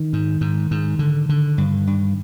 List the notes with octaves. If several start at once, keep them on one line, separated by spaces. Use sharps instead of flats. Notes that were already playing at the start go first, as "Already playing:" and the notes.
Already playing: D#3
G#2
G#2
G#2
D3
D3
G2
G2